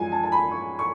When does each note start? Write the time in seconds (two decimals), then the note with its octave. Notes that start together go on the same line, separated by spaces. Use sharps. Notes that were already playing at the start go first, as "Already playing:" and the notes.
Already playing: F#2 F3 G#3 G#5
0.12 A5
0.23 A5
0.32 B5
0.51 C#6
0.79 C#6